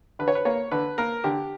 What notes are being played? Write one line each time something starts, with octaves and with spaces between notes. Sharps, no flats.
D3 B4
C#5
B4
A#3 C#5
D3 B4
A#3 A#4
D3 G4